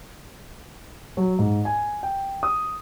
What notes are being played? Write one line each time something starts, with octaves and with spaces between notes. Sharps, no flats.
F#3
G#2
G#5
G5
D#6